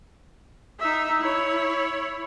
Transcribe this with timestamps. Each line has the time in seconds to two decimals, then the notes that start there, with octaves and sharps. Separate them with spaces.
0.80 D#4 E5
1.20 E4 C#5